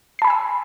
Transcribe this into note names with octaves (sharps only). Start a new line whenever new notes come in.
G#5 A5 B5 E6 C7